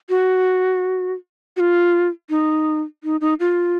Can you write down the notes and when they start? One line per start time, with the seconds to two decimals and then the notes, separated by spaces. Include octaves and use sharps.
0.09 F#4
1.57 F#4
1.60 F4
2.30 D#4
3.04 D#4
3.21 D#4
3.40 F4